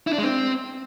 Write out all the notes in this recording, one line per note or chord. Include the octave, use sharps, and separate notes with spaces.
E4
D4
G#3
C4